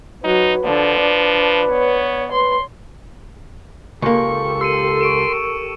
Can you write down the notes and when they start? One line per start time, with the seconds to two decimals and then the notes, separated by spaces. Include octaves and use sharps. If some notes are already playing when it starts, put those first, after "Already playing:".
0.24 F#3 D#4 B4
0.65 D3 F3
1.00 D4
1.70 B3 C#5
2.32 B4 C6
4.02 C#2 A#3 G4 A4 A#4 C#6
4.61 C6 E6 C#7 D#7
5.01 C#6 D7 E7